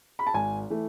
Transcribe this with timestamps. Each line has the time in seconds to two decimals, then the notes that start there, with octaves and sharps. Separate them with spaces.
0.19 B5
0.27 A5
0.34 G#1 G#5
0.70 E3 A3